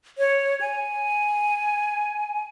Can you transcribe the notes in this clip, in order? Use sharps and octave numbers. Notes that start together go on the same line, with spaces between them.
C#5
G#5